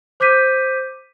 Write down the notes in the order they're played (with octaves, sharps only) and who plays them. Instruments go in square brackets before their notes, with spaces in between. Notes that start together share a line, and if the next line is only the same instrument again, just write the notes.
[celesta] C5 D6 G6 B6 D#7